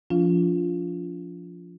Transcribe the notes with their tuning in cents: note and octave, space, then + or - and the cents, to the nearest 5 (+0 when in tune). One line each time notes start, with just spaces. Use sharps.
F3 +0 D4 -40 F4 +0